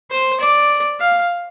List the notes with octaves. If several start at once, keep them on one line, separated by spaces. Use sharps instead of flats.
C5
D5
F5